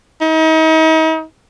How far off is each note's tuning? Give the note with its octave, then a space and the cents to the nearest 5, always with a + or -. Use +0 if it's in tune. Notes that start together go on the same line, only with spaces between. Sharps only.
D#4 +40